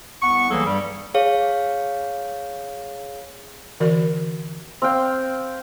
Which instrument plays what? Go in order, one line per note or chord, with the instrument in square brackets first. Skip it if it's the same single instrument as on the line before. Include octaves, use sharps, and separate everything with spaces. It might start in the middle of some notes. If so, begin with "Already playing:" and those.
[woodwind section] C2 B3 F#5 C#6
E3 F#3 G3 A#3 G#4 A4
G2 G3
[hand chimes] G#4 C#5 F5
[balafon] D3 E3 F#4 A#4 D5
[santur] C4 F5 G5